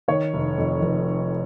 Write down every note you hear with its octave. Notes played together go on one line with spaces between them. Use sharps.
D#3 C#5
F1
F2
F1